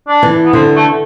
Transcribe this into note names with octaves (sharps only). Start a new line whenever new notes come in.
D4
E3
B3
D3 C4
A3